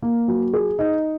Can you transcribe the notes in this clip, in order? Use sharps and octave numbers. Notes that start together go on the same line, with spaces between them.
A#3
F#3
G#4
D#4